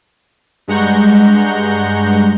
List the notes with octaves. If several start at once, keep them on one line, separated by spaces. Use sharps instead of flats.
G2 G#3 F#5 A#5 C#6 G6